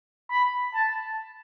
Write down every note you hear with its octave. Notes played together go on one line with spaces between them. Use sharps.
B5
A5